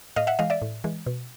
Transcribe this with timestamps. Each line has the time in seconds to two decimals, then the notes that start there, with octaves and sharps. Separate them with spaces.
0.16 A2 D#5 F5
0.27 E5 F#5
0.39 E3 G#3 D#5 F5
0.50 D5 E5
0.62 A2
0.84 E3 G#3
1.06 B2